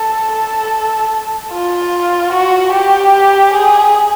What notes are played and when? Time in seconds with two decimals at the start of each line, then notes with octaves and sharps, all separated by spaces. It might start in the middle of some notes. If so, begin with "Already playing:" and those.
Already playing: A4
0.33 A4
1.52 F4
2.33 F#4
2.73 G4
3.54 G#4